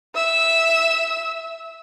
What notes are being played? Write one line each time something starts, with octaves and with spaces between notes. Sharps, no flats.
E5 E6